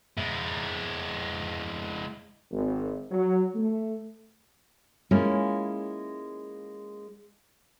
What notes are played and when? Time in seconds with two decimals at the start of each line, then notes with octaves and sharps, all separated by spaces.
0.18 G#3 E4
2.51 G#1
3.11 F#3
3.55 A3
5.11 G#3 A#3 C#4 E4 F4